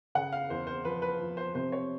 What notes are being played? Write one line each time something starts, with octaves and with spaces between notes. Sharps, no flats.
C#3 F#5
F5
E2 C5
C5
F3 B4
B4
F3
C5
C3 C5
C#5